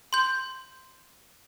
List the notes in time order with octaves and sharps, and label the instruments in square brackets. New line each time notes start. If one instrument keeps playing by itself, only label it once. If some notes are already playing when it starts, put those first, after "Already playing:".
[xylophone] C6 G6